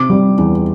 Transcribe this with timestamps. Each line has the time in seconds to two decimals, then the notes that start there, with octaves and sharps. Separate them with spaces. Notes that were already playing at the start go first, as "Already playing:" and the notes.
Already playing: C3 D6
0.10 G3
0.38 E2